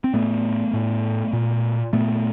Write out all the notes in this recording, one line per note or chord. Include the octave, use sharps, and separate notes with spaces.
C4
A2 A3 B3
A2
A#2
A#2 A3 B3